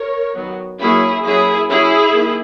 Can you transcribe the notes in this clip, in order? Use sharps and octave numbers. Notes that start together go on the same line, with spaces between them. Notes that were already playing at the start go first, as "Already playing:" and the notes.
Already playing: A#4 C#5
D#3 F#3 B3
F#3 A#3 C#4 E4 G#4
F#3 A#3 C#4 E4 G#4
F#3 C#4 E4 G#4
D#3 A#3